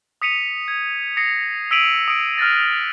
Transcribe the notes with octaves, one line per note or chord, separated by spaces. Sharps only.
D#6 B6 C#7 D#7 F7
G#6
D#6 A#6 C7 C#7
E6 B6 D7 D#7 F7 F#7
D#6 C#7 D7
F6 F#6 A6 A#6